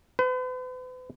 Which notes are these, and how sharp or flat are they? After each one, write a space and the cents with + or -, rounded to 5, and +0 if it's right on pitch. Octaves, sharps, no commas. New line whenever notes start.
B4 +45